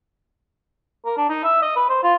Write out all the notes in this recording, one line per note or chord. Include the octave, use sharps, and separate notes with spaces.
A#4
D4
D#4
E5
D#5
B4
C5
F4